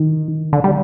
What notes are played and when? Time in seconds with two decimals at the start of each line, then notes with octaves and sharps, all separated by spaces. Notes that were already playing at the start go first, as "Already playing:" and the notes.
Already playing: D#3
0.53 D3
0.64 G3